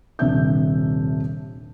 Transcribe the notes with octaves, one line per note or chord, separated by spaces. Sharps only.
D#1 C3 D4 E5 G6